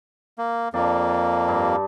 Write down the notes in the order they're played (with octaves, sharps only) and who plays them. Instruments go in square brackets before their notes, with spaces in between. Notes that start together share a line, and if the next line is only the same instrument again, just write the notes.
[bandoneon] A#3
[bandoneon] F2 A#3 [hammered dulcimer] D4
[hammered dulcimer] G2